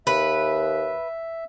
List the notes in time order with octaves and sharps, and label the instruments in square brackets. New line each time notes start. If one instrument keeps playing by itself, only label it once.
[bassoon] D#2 [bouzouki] B4 [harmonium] E5